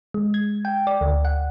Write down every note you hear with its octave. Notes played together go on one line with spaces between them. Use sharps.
G#3
G#6
G5
D5
D2
F#5